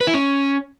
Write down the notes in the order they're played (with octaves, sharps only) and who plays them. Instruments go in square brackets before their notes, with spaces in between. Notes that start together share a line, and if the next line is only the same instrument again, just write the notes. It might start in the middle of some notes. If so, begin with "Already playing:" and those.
[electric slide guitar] B4
E4
C#4